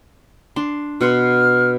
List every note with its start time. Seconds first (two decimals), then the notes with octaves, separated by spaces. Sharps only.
0.56 D4 C6
1.01 B2 F#5 C6 F6